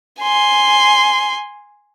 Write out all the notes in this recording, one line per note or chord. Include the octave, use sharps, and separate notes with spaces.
G#5 C6